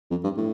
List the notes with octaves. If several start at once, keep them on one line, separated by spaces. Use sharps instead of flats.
F2
G2
A2